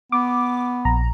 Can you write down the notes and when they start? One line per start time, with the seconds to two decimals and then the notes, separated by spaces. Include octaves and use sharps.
0.12 B3 D6
0.85 A#1 A#5